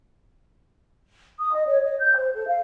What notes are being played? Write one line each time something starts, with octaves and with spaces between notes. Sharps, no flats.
D#6
D#5
C#5
D#5
G6
C5
A4
F5